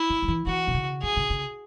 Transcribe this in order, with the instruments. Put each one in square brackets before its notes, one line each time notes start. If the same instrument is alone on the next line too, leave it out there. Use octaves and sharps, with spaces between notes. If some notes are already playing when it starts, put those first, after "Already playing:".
Already playing: [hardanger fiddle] E4
[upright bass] E3
F#3
E3
[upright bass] E3 [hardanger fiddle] F#4
[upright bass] B2
C#3
[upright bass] E3 [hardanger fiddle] G#4
[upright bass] C#3
C#3